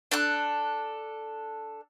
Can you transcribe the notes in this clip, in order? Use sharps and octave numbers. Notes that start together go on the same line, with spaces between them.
D4 A4 F#6